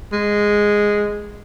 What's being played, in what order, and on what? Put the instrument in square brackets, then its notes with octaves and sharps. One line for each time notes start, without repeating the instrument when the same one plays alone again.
[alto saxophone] G#3